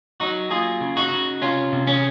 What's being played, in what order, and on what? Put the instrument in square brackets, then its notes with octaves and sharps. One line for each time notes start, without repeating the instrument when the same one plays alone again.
[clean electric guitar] F#3 D#4 F#4
A#3 F4 G#4
C#3
D#4 F#4
C#3
C3 C#4 F4
C3
C#4